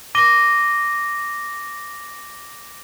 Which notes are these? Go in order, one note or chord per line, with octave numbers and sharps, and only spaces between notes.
D6 A#6 D#7 G7